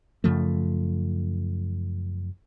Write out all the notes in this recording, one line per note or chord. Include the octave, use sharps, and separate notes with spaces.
F#2 C#3 F3 A3